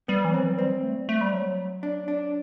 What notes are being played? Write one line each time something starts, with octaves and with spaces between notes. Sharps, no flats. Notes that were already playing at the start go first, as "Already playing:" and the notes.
G3 B3
E3
F#3 C4
E3
F#3
G3 C4
A3
G3
A3
G3
F#3
D4
D4